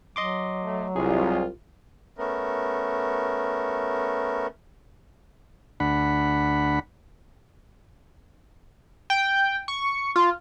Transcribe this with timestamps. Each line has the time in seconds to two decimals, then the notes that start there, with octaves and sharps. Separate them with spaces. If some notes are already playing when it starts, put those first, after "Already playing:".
0.16 F#3 D#5 C6 D6
0.63 A3
0.96 C2 F4 G#4
2.18 A3 B3 C#4 A#4
5.80 D2 D4 F#5 B5
9.10 G5
9.68 C#6
10.16 F4